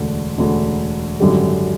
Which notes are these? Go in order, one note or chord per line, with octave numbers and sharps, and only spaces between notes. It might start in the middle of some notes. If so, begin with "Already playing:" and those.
Already playing: E1 D2 D3
E1 D2 D3
G#1 F#2 D3 G3